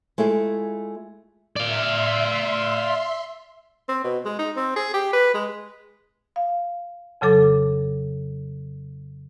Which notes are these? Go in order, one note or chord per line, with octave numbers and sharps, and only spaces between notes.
G#3 A3 E4 F4 G#4
D5 E5 F5 C6
C4
B2
G#3
D#4
C4
G#4
G4
B4
G#3
F5
F2 C#3 F#3 A4 D6